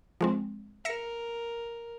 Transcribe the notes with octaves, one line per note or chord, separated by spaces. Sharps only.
F3 G#3 C4
A#4 E5 A#6 C#7